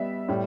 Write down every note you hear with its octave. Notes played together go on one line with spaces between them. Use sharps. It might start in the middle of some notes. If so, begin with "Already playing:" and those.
Already playing: G3 B3 D5 E5
A2 G3